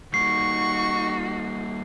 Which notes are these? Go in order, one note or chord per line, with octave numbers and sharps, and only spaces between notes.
G3 A#3 D#4 F#4 C#6 C7